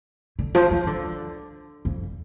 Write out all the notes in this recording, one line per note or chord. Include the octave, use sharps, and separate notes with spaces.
D3
F3
F3
D3
F2